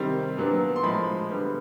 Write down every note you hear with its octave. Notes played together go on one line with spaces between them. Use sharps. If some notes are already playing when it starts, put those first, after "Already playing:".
Already playing: C3 D#3 G3 C4
A#2 F#3 B3 D4
C6
A2 F3 G#3 B5
D3 G3 B3